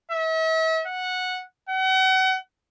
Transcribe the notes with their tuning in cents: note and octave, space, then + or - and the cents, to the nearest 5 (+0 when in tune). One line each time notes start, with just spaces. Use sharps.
E5 -40
F#5 -10
F#5 +35